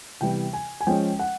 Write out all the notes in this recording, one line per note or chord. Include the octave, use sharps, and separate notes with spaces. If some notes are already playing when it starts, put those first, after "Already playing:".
C3 E3 G3 B3 G5
G#5
G#5
F3 G#3 C#4 G5
F#5